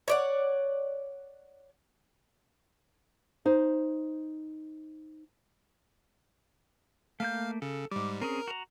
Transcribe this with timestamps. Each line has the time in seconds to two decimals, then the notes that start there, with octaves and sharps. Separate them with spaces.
0.08 C#5 D5 F#5
3.45 D#4 C5
7.20 A3 A#3 F5 G6
7.62 C#3 A4
7.91 G#2 G3 D6
8.22 C4 C#4 G#4 A#4
8.48 F#4 A#5